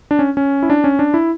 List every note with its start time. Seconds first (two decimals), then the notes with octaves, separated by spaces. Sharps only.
0.11 D4
0.19 C#4
0.37 C#4
0.63 E4
0.70 D4
0.84 C#4
0.99 D4
1.14 E4